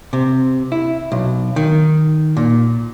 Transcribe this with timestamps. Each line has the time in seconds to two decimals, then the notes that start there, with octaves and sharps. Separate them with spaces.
0.13 C3
0.72 E4
1.12 B1
1.56 D#3
2.37 A#2